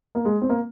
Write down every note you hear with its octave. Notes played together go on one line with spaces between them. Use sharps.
A#3
G#3
C4
A#3